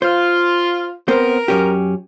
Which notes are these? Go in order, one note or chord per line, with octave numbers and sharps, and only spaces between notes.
F4 C5
B3 C4 A#4 C5
F#2 C#4 G4